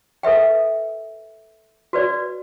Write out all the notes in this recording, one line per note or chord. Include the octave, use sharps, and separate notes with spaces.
A4 B4 E5 G5
F#4 B4 D5